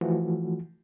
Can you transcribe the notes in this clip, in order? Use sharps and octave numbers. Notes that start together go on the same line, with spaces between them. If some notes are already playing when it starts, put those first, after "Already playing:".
E3 F3 A3 F#4